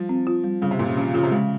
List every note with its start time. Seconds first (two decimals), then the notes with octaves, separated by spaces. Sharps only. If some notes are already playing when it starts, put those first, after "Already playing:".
Already playing: F3 G3
0.09 C4
0.27 F4
0.44 G3
0.62 C#3 G3
0.71 C3
0.79 A#2 A#3
0.88 C#3
0.97 F3 C#4
1.14 C#3 F4
1.23 C3
1.31 C#3 G#3